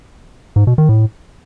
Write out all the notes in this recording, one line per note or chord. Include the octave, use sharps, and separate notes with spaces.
G#2
B2
D#3
A2